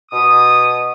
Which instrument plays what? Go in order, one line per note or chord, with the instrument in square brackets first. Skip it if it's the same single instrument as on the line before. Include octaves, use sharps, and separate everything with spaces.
[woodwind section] B2 D#6